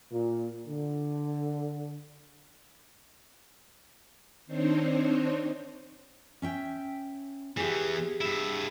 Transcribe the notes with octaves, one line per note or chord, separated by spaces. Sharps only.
A#2
D3
D#3 C4 D4 D#4 C5 C#5
C#4 E5 G5
E2 E3 G4 G#4
G2 E4